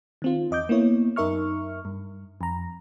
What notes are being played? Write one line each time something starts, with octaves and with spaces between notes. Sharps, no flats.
D#3 C4 F4
E2 D#5 D6 G6
A#3 B3 E4 C#5
F#2 D#4 A#4 E5 C#6 F6
G2
F2 A#5